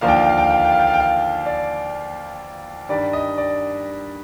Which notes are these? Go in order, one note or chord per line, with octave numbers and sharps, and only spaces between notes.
D#2 D3 F3 A#3 D4 F5
G5
F5
G5
F5
G5
F5
G5
F5
G5
F5
G5
F5
G5
F5
D5
G2 D#3 G3 D5
D#5
D5